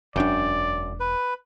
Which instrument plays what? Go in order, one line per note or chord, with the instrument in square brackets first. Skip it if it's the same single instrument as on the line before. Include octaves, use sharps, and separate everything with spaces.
[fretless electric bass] E1 D4 [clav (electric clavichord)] F#2 G5 [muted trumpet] D5
[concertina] B4